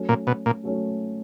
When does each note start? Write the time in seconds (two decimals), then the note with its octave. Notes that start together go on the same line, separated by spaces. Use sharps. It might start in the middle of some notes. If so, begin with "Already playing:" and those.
Already playing: F#3 A3 C#4
0.09 A#2
0.27 B2
0.46 A#2
0.63 F#3 A3 C#4